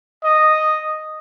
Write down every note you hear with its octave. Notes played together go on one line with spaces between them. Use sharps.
D#5